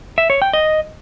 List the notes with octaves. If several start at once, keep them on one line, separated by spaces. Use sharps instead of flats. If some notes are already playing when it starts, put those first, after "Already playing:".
E5
C#5
G5
D#5